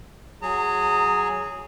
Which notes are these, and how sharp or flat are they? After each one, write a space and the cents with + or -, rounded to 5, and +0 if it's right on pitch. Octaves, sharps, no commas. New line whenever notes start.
F#3 +0 G#4 +0 A#5 -35